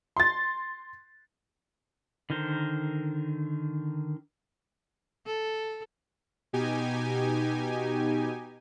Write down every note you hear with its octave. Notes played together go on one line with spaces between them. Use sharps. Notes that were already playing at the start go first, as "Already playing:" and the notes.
C6 A6
D3 D#3 A#4 C5
A4
B2 D#4 G4 G#5